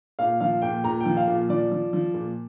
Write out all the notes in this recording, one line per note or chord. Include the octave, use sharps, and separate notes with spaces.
A#2 F5
F3 F5
A#2 G5
A#2 A#5
G5
F3
F5
A#2
F3 D5
F3
F3
A#2